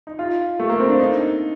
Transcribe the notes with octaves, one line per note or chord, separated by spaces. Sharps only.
D#4
F4
A3
A#3
C4
D4
D#4